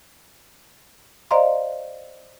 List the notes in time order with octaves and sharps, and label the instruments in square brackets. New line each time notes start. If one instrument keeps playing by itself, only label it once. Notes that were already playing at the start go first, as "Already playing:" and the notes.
[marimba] C5 D5 D#5 F5 A#5 C6